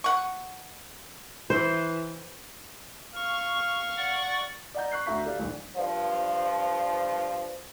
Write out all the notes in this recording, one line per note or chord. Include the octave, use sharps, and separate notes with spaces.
F#5 C#6
E3 C5
F5 C#6
D5 F#5 C#6
D5 D#5 F#5 A#5 G6
C#6 F#6 C7
D2 F#4 E5 A#5 C#6 B6
G4 A4 D5 F5
A#1 D#2 G3
G2 F3